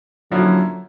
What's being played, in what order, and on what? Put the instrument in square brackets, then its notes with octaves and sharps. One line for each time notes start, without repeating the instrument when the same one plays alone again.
[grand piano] D3 F3 A#3 C#4 E4 [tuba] F#3